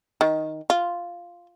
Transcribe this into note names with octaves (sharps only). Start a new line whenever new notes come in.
D#3
F4